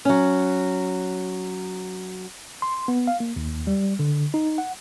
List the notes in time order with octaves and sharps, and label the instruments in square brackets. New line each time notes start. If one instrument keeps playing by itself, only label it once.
[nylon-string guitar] F#3 C#4
[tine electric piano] C6
B3
F5
A#3
D#2
G3
D3
D#4
F#5